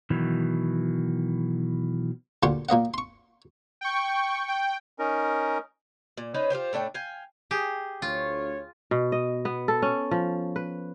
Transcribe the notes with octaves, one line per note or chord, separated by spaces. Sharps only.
B2 D#3 E3 F#3
D2 A#2 G4 F#5 C6 C#6
A#2 A#3 D#5 F#5
C6 C#6
G5 C#6
G5
C#4 D#4 A#4
A#2
C#4 D#4 B4 C5
F4 G4 C5 G5
A2 A3 D4 G5
F5 G5 G#5
G4 G#4
D2 F4 C#5
B2
D#5
B3
A4
C#4
F3
B4